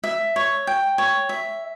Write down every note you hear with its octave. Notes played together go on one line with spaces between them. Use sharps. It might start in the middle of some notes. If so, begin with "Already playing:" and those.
E5
C#5
G5
C#5
E5